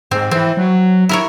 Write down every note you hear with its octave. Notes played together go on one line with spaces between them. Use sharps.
G#2 C4
E3 C4
F#3
E4 A#4 C#5